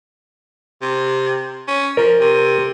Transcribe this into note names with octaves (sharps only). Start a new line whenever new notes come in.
C3
C#4
F3 A#4
C3